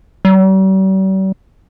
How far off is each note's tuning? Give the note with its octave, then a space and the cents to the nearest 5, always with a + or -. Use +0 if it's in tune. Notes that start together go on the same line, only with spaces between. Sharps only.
G3 -45